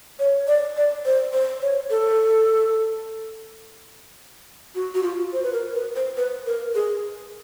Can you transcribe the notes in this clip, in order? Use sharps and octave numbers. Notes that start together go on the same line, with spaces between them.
C#5
D5
D5
C5
C5
C#5
A4
F#4
F#4
F4
C5
B4
A#4
B4
C5
B4
A#4
G#4